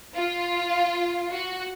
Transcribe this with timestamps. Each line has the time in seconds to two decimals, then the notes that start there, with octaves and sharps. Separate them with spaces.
0.15 F4
1.31 F#4